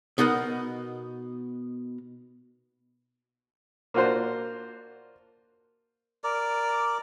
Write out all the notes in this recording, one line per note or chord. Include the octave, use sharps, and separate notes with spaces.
B2 B3 D#4 A#4 F#5
A#3 D4 F4 F#4 C5
A#4 D5